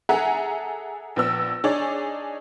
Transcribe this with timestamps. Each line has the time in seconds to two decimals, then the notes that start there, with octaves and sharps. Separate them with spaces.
0.09 G#4 A4 E5 F#5 G#5 A#5
1.16 A#1 B3 E6
1.64 D4 D#4 G#4 C#5 D5